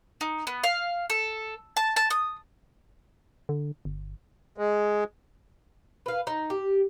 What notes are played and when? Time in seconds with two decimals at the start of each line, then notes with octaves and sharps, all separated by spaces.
0.21 D#4
0.47 B3
0.64 F5
1.10 A4
1.77 A5
1.96 A5
2.10 D#6
3.49 D3
3.85 G1
4.58 G#3
6.06 B4 F5
6.27 D#4
6.50 G4